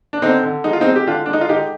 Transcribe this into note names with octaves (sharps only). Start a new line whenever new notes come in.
D4
D3 C4 D#4
D3
G#3 D#4
F4
C4 D#4
G#3
G4
D3 D4 F4
G#3 D4
D#4
F4
D3 D#4 G4